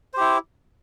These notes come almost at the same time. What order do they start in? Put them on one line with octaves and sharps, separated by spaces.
C5 G4 E4